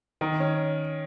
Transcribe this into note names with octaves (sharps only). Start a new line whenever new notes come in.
D#3
C#4